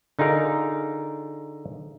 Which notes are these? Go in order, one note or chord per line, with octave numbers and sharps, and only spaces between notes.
D3 D#4 F4 G#4 A#4